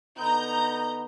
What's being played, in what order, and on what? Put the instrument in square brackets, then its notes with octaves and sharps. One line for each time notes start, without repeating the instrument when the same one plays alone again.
[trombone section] D3 B3 D#4 [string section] A#5 G6